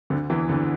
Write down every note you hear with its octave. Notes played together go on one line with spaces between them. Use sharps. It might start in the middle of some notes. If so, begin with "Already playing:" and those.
D2 D3
E2 E3
D2 D3